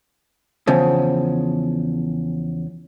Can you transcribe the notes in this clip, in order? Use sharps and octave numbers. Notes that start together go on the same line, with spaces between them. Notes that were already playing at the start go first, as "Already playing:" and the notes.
E2 C#3 F3